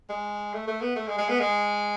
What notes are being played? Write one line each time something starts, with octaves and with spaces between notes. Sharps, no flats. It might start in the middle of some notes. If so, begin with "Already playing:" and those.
G#3
A3
A3
B3
A3
G#3
G#3
B3
G#3